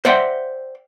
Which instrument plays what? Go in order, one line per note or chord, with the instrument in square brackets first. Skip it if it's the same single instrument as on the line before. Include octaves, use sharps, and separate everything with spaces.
[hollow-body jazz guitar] C5 D5 E5 F#5 G5 C6